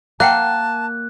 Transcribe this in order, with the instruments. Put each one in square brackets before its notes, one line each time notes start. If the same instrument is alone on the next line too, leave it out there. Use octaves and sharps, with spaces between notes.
[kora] A#3 [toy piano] E5 F#5 G5 [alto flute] A5 [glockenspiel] F#6